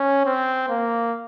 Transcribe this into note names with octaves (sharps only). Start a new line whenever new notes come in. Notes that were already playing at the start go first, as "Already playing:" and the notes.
Already playing: C#4
C4
A#3